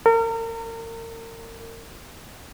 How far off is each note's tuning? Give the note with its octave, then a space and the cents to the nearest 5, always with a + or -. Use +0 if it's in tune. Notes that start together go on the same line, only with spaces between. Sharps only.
A#4 -35